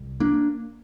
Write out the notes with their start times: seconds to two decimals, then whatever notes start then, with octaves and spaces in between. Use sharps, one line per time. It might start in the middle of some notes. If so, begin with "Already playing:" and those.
Already playing: C2
0.20 A#3 D4